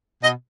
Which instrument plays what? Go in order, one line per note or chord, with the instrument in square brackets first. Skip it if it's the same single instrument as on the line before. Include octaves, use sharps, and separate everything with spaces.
[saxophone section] B2 D#5